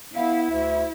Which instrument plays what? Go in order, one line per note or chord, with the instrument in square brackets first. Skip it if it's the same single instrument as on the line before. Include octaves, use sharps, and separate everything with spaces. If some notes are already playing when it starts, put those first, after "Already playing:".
[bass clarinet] B3 [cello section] E4 [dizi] F5
[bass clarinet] D2 [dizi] E5